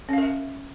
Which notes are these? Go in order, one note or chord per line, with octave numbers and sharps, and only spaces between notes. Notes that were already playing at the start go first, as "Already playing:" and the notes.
C#4 A#4 E5 F5